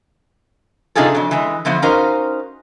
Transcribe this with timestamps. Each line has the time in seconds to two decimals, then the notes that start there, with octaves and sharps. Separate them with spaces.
0.95 C3 D4 D#4 F4 G#4 A4
1.15 F2 F#3
1.31 E3 G#3
1.65 D3 E3 F3 B3
1.82 C#4 D#4 F#4 A#4 C5 F5